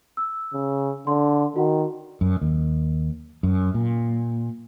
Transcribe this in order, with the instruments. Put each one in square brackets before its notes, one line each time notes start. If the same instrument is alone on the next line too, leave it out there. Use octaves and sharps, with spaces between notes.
[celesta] E6
[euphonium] C#3
[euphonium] D3 [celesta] D5 C6
[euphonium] D#3 [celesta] F#4 A#4 F#5
[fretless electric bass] F#2
D#2
F#2
A#2